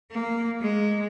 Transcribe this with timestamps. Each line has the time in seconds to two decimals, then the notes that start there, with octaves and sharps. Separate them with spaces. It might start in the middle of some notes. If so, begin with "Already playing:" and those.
0.11 A#3
0.60 G#3